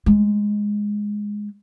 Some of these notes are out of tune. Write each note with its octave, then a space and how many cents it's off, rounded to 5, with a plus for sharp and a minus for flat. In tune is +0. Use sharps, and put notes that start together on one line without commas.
G#3 -5